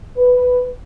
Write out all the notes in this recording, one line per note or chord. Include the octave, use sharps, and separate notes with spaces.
B4